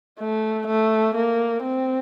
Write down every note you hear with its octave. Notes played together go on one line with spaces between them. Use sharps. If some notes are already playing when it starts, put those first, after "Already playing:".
A3
A3
A#3
C4